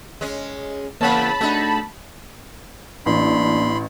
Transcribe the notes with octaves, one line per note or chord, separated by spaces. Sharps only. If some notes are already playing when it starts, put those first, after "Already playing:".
G#3 C#4
E2 C#3 A#3 C#5 F#5 A5 B5
A3 D4 D#4 F#4
A1 A#3 D4 B5 C6